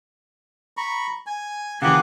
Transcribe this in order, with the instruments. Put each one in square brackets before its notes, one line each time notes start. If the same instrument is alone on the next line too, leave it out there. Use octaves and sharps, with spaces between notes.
[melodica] A#5 B5 C#6
G#5
[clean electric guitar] C#3 E3 [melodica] A#3 G4 F#5